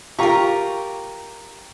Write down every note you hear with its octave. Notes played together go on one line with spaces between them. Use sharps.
F4 G4 A#4 A#5 C#6